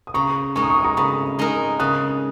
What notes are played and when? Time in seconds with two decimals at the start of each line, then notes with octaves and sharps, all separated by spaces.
0.07 D#6
0.14 C#3 A#5 C#6
0.56 G#3 D#4 A#4 C#6
0.63 D#6
0.70 C#6
0.78 D#6
0.84 A#5 C#6
0.97 C#3 B5 D#6
1.39 G#3 D#4 A#4
1.79 C#3 D#6 F#6